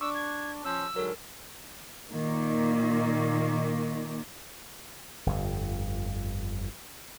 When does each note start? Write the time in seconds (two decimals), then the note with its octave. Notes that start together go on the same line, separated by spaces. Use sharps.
0.01 D4 C#6 D6 E6
0.15 G#6
0.65 F3 C#4 E6
0.96 G#2 D3 F#3 A4 A#4
2.11 A#2 D#3 A#3
5.26 G1 F2